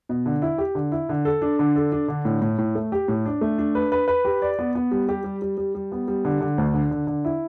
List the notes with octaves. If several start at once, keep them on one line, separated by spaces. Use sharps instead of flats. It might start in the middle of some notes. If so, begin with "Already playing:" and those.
B2
D3
E4
G4
D3
E4
D3
A4
D4
D3
A4
D4
D3
A2
A2
A2
A3
G4
A2
D4
A3
D4
B4
B4
B4
G4
D5
B3
B3
G3
G4
G3
G3
G3
G3
B3
G3
D3
D3
D2
D3
D3
D3
E4